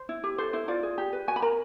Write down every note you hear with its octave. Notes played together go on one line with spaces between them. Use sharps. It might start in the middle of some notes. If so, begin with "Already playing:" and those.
Already playing: C5
E4
G4
A4 C5
E4 C5
F4 D5
G#4
G4
B4
F#4 G#5
B5
A#4 A#5